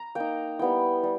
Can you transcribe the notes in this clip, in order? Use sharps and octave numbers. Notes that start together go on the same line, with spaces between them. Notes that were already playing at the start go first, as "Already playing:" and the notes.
Already playing: A#5
A#3 D#4 G5
G3 B3 E4 G5
G3